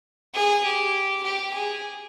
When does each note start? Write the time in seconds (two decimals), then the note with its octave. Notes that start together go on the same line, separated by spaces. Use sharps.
0.34 G#4
0.64 G4
1.23 G4
1.54 G#4